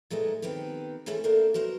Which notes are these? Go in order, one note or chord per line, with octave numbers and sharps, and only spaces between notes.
A#2 G#3 A3 B3 D#4
D#3 B3 C4 G4 B4
C#3 E3 G#3 A3 C#4 E4
A3 A#3 D4 E4 C5
F#3 B3 A#4 C5